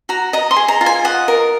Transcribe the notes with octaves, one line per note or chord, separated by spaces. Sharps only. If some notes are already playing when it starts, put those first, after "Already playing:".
F#4 A#5
D#5 A#5
C6
G#4
A#5
F4
G#5
D#5 F#5
A#4